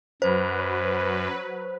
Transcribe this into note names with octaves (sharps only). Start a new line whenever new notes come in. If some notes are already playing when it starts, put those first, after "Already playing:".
F#2 F#3 B4 C5